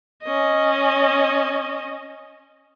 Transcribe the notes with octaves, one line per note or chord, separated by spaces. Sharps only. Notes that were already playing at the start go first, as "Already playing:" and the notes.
C#4 D#5